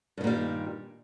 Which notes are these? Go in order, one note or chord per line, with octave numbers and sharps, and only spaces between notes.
G2 A#2 D#3 G3